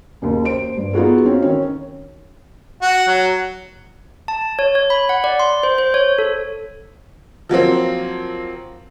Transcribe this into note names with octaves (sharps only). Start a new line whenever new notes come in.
F#1 D#2
C5 D7
G2
B3 D#4 F4 F#4 G#4 A4
C4 C#4 D#4 F#4
D#3 C#4
F#4
F#3
A5
C#5
C#5
B5
F#5
D5
C6
C5
C5
C#5
A4
F3 F#3 A#3 C4